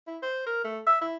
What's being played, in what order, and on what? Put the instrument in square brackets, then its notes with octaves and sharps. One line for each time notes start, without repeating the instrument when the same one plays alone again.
[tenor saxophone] E4
C5
A#4
A3
E5
E4